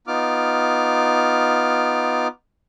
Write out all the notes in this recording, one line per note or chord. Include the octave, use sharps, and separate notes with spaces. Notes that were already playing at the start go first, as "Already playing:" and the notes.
B3 D#4 F4 D6 F6